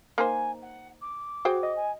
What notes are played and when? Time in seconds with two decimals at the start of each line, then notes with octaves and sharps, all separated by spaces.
0.18 A#3 D#4 C5 G#5
0.61 F#5
1.01 D6
1.45 F#4 G#4 C5 G5
1.63 D#5
1.76 G#5